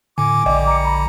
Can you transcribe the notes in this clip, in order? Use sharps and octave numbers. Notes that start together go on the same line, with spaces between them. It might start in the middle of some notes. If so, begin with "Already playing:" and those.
A2 D3 G#5 D6
A#1 D3 D5 D#5 G5
A#5 C#7
A#5 B5